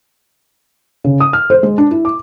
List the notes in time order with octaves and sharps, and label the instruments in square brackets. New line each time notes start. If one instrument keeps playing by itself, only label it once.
[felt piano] C#3
D#6
F6
C5
G#3
D4
E4
D6